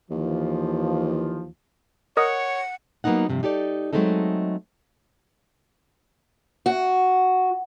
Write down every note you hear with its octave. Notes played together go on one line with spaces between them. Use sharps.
D#2 E3 F3
A#4 C#5 D#5 F#5 D#6
F#3 A#3 B3 C#4 D#4 F#5
E2 G2 C3 F3
D#4 G4 A4 D5
F#3 G#3 A3 C4 D#4 A4
F#4